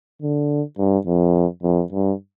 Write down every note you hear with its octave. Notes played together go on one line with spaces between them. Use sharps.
D3
G2
F2
F2
G2